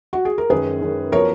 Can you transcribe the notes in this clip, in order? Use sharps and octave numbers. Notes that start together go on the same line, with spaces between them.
F#4
G#4
A#4
F#2 D#3 G#3 C#4 G#4 B4
F#2 D#3 G#3 C#4
F3 B3 F#4 A#4 C#5